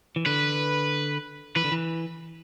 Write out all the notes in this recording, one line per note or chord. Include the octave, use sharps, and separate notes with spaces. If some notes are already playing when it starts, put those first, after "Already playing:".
E3
D3 B4
E3 B4
D3
E3